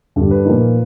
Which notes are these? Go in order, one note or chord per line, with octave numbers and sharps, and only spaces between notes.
G2 D3 G3
B4
A#2 F3 A#3 D#4